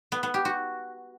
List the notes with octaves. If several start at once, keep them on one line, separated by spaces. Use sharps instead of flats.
B3
B3
G4
F#4